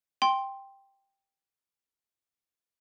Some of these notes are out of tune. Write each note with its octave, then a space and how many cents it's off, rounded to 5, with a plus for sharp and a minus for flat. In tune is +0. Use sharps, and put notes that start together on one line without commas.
G5 +5 C6 +10